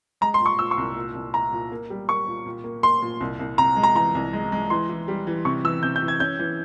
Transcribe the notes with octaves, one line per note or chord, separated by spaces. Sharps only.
G#3 A#5
C6
A#2
C#6
A#2 E6
C#6
C2
A#2
C2
E4 A#5
A#2
A#3
G3
A#3 C#6
A#2
A#2
A#3
A#3 C6
A#2
C2
C2
C3 A#5
G#3
A#5
E3 A#5
C2
G#3
G#3
E3 C6
E3
G3
E3
C3 C#6
E3 E6
C3 G6
G6
E3
G#6
C#4 G6
E3